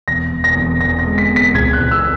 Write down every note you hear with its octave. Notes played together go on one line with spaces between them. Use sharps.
E1 A#6
E1
A#6
E1
E1 A#6
A#6
G#3
B6
E2
B6
C#2 G#6
F#6
C#2
E6